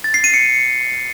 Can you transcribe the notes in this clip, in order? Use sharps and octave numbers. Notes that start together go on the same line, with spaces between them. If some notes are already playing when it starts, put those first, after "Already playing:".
A6
C7
D#7
C#7